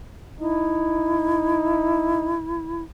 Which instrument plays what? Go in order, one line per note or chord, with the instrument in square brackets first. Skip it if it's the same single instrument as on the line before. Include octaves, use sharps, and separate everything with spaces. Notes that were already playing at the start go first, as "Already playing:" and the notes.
[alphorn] D#4 [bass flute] E4